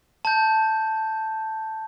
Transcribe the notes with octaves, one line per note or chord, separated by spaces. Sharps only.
A5 G6